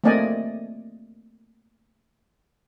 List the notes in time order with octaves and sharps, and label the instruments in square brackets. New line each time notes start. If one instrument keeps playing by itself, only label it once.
[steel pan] A3 A#3 C4 D5 D#5 G#5